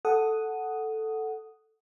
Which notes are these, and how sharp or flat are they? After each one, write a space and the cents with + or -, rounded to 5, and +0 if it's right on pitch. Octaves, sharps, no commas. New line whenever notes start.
A4 +0 F#5 +0 D#6 +0